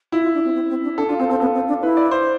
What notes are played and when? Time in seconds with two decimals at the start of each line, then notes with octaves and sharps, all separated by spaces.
0.12 E4 F4
0.23 F4
0.34 D4
0.45 C4
0.55 C4
0.69 C4
0.84 D4
0.97 D4 A4
1.09 D4 F4
1.19 C4 A4
1.29 C4 A4
1.40 B3 A4
1.54 C4
1.69 D4
1.83 E4 B4
1.97 D5
2.11 C5